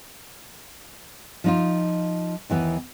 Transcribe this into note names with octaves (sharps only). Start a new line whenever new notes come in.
F3 D#4 F4
D#2 E3 B3